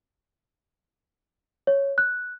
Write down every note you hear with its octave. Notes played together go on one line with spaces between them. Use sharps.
C#5
F#6